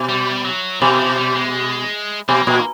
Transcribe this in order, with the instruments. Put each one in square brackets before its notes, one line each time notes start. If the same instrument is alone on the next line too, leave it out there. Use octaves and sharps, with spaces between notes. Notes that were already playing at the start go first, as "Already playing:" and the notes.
Already playing: [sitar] B2
[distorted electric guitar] G3
F#3
[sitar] B2 [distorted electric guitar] D#3
[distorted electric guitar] F3
G3
G#3
[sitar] B2 [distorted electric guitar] A#3
[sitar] A#2